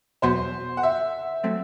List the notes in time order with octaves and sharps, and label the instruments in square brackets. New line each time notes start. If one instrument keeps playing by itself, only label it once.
[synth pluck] E2 B2 F#3 B3 F#4 [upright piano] C5
[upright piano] F#5
E5
[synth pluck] F#3 A3 C4